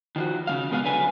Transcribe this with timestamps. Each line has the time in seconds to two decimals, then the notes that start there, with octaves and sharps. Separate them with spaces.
0.16 D#3 F3 F#4
0.47 C#3 G3 F5
0.71 B2 G#3 B3 G#4 F5
0.84 D3 F#3 B4 G#5